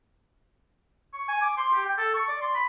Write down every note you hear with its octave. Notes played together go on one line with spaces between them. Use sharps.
C#6
G#5
D6
C6
G4
G5
A4
C#6
D5
C6
B5